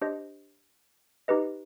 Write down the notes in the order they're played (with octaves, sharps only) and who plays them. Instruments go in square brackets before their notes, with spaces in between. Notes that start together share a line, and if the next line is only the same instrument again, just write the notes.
[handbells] D4 G4 C5 D#5
D#4 G4 B4 D#5